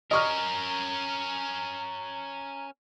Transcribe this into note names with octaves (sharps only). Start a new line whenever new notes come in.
C#4 A#4 D#5 A#5 C#6 F6